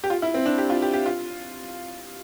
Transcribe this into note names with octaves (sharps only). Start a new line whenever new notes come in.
G4
F4
E4
C4
D4
G4
F4
G4
G4
F4